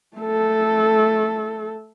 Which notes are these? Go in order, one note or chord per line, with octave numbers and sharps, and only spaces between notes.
A3 A4